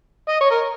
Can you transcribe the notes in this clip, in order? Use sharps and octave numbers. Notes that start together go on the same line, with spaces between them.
D#5
C#5
A#4